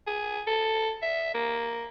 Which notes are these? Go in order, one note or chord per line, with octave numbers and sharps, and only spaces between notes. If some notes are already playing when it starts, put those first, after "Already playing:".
G#4
A4
E5
A#3